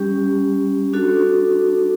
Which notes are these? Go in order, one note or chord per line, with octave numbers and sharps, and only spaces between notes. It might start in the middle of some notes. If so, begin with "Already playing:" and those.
Already playing: G3 C#4 G4
D4 F#4 A4